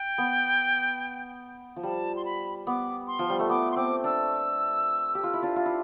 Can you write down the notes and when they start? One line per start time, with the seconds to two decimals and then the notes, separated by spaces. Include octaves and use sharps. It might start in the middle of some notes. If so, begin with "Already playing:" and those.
Already playing: G5
0.18 B3
1.76 F3
1.83 G3 A5
2.16 C6
2.25 B5
2.67 B3 D6
3.07 C6
3.19 F3
3.29 G3
3.39 A3
3.50 B3 D6
3.72 C6
3.76 C4 D6
4.04 D4 E6
5.15 G4
5.24 F4
5.33 E4
5.42 D4 F4
5.56 F4
5.66 E4